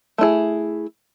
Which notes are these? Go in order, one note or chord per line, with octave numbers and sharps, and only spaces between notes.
A3 E4 G#4